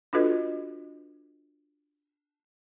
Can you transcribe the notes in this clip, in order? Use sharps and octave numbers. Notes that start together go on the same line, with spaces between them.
D4 F4 F#4 A4 B4 D#5